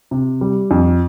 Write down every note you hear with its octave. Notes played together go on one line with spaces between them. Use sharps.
C3
G3
F2